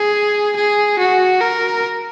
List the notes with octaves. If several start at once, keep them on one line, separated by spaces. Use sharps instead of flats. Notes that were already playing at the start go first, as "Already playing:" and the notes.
Already playing: G#4
G#4
F#4
A#4